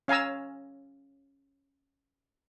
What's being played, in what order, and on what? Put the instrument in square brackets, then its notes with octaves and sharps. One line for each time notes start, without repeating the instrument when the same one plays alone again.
[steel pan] C#4 F5 G#5 A#5 E6